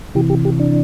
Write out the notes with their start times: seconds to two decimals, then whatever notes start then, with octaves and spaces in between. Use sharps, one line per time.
0.15 C3 E3 G4
0.30 G4
0.45 G4
0.59 D4